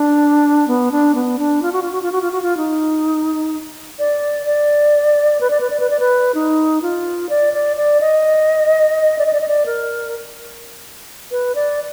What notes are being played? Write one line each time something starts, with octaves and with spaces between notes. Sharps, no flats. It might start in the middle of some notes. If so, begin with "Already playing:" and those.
Already playing: D4
B3
D4
B3
D4
F4
F#4
F4
F#4
F4
F#4
F4
F#4
F4
D#4
D5
D5
B4
D5
B4
D5
B4
D5
B4
D#4
F4
D5
D5
D5
D#5
D5
D#5
D5
D#5
D5
A#4
B4
D5